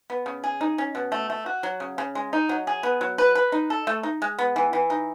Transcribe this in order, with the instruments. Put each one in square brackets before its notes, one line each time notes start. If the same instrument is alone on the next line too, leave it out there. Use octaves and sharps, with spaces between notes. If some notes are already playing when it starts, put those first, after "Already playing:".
[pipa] B3
C#3
G#4
D#4
C#4
B2
A3
A3
F#4
F#3
C#3
C#3
G#3
D#4
F#3
G#4
B3
F#3
B4
B4
D#4
A4
A3
D#4
G#3
B3
E3
E3
D#4